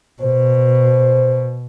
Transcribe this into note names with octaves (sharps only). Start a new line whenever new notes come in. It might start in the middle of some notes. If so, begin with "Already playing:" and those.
B2 C5